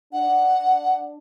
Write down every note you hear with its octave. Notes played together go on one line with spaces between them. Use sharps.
D4 F#5